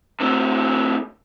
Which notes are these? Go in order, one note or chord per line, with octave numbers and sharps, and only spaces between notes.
A2 C4